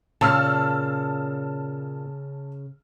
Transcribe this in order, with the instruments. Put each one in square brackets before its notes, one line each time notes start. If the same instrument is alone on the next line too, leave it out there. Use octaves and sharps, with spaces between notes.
[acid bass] A#2 [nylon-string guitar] C#3 [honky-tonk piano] A5 E6 F6